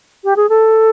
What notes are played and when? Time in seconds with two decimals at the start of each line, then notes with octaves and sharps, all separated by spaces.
0.24 G4
0.36 G#4
0.49 A4